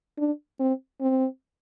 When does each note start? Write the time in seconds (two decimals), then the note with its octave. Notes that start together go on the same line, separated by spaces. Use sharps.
0.18 D4
0.60 C4
1.01 C4